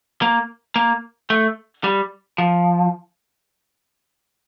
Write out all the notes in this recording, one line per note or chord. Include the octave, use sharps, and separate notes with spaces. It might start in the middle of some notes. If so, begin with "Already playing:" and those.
A#3
A#3
A3
G3
F3